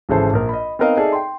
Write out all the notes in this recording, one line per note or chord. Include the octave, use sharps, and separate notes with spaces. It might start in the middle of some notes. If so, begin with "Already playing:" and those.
G#1 C#3 E3 G#4 A4 C5
A#1 A#4
D#5 B5
B3 C4 D#4 A#4 D#5 F5
D#4 G#4 A4 D5 E5
G5 C6